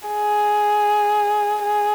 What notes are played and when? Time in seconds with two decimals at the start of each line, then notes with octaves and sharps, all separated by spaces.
0.08 G#4
1.64 G#4